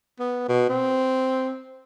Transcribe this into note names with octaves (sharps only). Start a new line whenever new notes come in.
B3
B2
C4